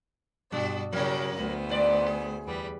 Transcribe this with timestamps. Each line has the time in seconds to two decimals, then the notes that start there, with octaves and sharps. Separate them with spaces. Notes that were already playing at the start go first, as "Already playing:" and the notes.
0.52 G2 B2 G3 D4
0.92 C#3 F#3 G3 A#3 E4
1.36 D2 B3 C5
1.70 G#2 D5
2.08 G#4
2.46 E2 G3 B4